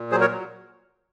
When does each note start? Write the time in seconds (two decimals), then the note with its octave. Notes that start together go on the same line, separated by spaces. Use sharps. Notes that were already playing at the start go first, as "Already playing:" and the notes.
Already playing: A#2
0.11 F#3 G#4 C5
0.21 A#4 C#5
0.30 F#3